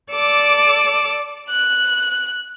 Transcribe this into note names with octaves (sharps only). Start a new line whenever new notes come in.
A4 D5 D6 E6
F#6